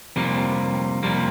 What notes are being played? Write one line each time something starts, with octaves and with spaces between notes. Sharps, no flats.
F2 C3 G3 A#3
F2 C3 G3 A#3